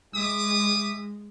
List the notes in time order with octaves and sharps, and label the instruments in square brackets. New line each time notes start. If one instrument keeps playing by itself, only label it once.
[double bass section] G#3 [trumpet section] E5 D6 D#6